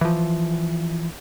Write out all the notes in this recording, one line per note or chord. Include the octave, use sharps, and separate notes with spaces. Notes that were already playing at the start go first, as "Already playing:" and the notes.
E3 F3